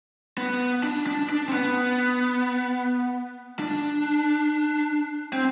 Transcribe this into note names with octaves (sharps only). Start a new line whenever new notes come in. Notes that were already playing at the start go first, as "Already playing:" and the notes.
B3
D4
D4
D4
C4
B3
D4
C4